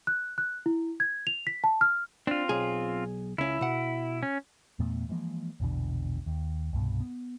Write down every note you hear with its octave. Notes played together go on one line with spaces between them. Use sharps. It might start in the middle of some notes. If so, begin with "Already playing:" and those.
F#6
F#6
E4
G#6
F7
B6
A5
F6
C4 D4 F4
B1 G#4
C#2 C#4 E4
B2 F#5
C#4
E2 A#2 A3 B3
E3 F3 G#3 A#3
A#1 E2 B2 D3
D#2
C2 G2 B2
B3